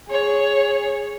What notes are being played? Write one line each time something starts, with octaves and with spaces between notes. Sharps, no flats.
G#4 C#5